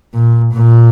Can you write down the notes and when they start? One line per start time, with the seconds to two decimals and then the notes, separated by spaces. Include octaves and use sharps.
0.14 A#2
0.54 A#2